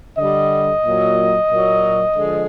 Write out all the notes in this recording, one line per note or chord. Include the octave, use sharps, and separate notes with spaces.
D3 G3 D#5
A#2 F#3
A#2 F#3
D3 F3 G#3